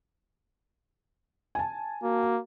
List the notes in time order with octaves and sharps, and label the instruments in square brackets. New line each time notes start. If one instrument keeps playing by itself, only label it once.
[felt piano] G#5 A5
[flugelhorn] A#3 [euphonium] F#4